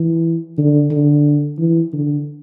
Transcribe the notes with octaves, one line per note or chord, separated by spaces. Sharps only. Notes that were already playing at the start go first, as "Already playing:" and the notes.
Already playing: E3
D3
D3
E3
D3